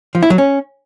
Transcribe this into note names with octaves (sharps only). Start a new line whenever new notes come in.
F3
E4
F#3
C#4